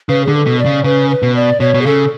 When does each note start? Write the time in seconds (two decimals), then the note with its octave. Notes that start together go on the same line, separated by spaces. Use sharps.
0.09 C#3 B4
0.24 D3 G#4
0.34 A4
0.46 B2
0.59 D5
0.66 C#3
0.84 C#3 B4
1.10 B4
1.23 B2
1.36 D5
1.60 B2 C#5
1.74 B2
1.81 G#4
1.86 C#3 A4